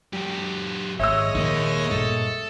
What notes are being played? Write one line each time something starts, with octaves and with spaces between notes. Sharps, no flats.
F#2 G4
G#1 G#3 C#5 D#5 E5 E6
A#1 D#3 A#3 D#4
G2 A#2 A4